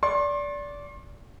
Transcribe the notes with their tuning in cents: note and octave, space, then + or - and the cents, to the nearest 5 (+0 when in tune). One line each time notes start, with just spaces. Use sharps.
D5 -20 C6 +40